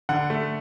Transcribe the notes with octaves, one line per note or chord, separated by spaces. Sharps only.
D3 F#5
A3